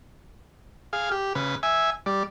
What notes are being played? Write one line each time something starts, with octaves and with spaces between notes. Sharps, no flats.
G#4 F5
G4
C#3 B4
E5 G#5
G3 D5